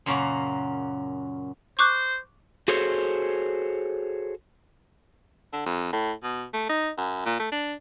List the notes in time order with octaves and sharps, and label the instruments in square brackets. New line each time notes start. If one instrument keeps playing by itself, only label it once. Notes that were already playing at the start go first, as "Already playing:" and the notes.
[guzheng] F#2 A#2 C#3 A#3 F#4
[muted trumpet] C5 [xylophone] C#6 D6 F#6
[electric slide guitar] F#4 G#4 A4 C5 C#5
[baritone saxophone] D3
F2
A2
B2
A3
D#4
F#2
A#2
A3
D4